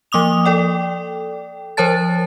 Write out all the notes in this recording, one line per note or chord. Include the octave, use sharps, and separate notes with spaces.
F3 A#3 D6 D#6 F7
A4 D5 G5
F3 A#4 C5 C#5 A5 A6